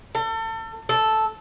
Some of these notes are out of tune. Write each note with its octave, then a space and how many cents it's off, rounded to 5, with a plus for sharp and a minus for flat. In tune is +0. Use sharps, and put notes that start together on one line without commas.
A4 +35
A4 -5